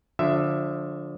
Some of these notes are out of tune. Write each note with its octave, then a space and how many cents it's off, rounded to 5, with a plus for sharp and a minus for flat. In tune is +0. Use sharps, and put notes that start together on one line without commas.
D3 +0 F3 +30 E5 +10